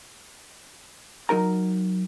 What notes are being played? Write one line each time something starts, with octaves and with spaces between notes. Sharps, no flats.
F#3 D#4 A#4 A#5